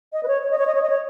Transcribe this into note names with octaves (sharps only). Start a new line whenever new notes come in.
D#5
B4
C#5
C#5
D#5
C#5
D#5
C#5
D#5
C#5